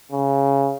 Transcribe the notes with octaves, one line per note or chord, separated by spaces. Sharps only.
C#3